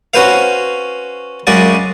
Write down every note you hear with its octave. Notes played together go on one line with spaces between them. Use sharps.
C#4 F#4 B4 C5 F5
F#2 C#3 G#3 F#4 D5